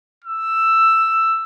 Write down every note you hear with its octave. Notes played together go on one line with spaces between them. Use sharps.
E6